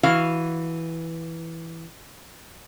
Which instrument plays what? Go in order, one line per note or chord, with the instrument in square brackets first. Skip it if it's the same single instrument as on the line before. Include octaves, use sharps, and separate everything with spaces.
[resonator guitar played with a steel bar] E3 F#4 F5